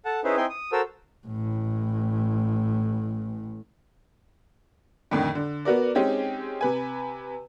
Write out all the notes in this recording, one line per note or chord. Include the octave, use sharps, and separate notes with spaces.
A4 F#5 A5
C#4 D#4 E4 G#4 B4 C5
C4 D#4 E4 G5 G#5 C6
D#6
F#4 A4 A#4 C5 E6
A1 A2
F2 A2 D3 D#3
D3
B3 F#4 A#4 D5
G#3 C4 C#4 D#4 G4 G#4
C3 B4 G#5